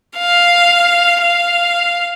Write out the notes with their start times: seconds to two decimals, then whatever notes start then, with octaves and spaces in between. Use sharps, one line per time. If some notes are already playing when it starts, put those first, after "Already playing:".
0.17 F5
1.21 F5